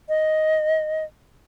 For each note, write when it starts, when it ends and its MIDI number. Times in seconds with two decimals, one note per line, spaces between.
0.09 1.04 75